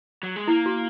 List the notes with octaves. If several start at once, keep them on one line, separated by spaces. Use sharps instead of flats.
F#3
G#3
A#3 E4
F#4